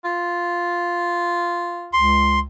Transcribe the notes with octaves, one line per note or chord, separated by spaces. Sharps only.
F4
C#2 C6